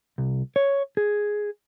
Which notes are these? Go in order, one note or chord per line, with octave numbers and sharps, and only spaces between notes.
C2
C#5
G#4